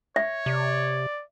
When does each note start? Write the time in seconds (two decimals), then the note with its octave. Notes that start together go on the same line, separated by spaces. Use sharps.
0.16 C#5 E5
0.46 C3 D5